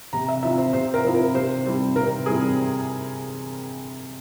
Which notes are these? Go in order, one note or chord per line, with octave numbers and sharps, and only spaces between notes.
C3 A#5
E5
F3 C4 E4 E5
C5
C3 C5
A#4
F3 C4 E4
A#4
C3 C5
G3 C4 E4
C3 A#4
G3 C4 E4 G#4